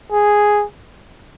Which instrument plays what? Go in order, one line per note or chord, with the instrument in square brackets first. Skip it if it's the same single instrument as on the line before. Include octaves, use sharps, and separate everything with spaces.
[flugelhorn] G#4